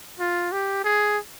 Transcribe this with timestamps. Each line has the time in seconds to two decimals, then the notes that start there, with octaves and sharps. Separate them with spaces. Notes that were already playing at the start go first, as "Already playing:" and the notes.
0.19 F4
0.52 G4
0.84 G#4